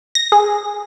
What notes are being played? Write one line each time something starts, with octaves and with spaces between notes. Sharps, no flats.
A#6
G#4